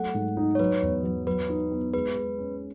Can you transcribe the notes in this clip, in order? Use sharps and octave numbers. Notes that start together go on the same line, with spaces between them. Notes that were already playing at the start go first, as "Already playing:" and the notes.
Already playing: F#3 A3 F#5
G#2
D#4
C#5
F#3 B4
E2
F#3
F#3 B4
D#4
B3
G#3 B4
G#3
C#4